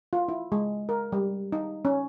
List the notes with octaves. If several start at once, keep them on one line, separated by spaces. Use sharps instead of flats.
F4
E4
G#3
A#4
G3
D#4
C#4